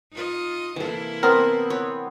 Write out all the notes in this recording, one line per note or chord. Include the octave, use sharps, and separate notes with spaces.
D#4 F4 D#5
C3 E3 A#3 E4 A4
B3 C4 A#4 B4 A5
B4 C#5